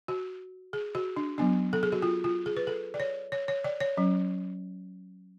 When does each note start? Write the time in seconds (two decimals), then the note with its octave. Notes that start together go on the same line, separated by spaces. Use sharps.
0.08 F#4
0.73 G#4
0.95 F#4
1.16 D4
1.38 F#3 B3 D4
1.73 A4
1.83 G#4
1.92 F#4
2.02 F4
2.24 F4
2.46 G#4
2.56 B4
2.67 A4
2.94 D5
3.00 C#5
3.32 C#5
3.48 C#5
3.64 D5
3.80 C#5
3.97 F#3 C#4